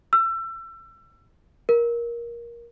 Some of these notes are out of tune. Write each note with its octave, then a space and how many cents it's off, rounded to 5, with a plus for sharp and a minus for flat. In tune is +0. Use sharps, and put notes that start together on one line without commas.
E6 +30
A#4 +15